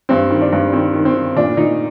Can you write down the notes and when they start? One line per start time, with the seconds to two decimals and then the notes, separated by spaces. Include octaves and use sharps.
0.09 G2 C4
0.30 D#3
0.41 D4
0.52 G2
0.72 D#3 C4
0.94 D#3
1.05 C4
1.15 D#3
1.36 A#2 D4
1.57 A#2 D#4